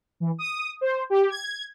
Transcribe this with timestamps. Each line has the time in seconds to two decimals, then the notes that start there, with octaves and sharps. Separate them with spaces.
0.20 E3
0.39 D#6
0.81 C5
1.10 G4
1.30 G#6